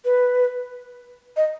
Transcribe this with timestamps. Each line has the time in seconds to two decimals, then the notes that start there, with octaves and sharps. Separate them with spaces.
0.05 B4
1.37 D#5